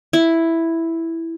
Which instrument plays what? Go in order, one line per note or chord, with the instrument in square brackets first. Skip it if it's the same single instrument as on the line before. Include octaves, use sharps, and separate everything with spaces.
[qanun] E4